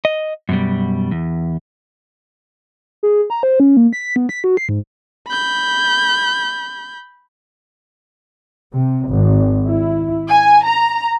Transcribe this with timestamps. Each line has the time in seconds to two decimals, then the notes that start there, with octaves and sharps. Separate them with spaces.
0.05 D#5
0.49 F#2 B2 G3
1.11 E2
3.03 G#4
3.30 A#5
3.43 C5
3.60 C#4
3.77 A#3
3.93 B6
4.16 B3
4.29 B6
4.44 F#4
4.57 C7
4.69 G#2
5.27 B5 G6
8.73 C3
9.09 G#1
9.67 E4
10.29 G#5
10.66 A#5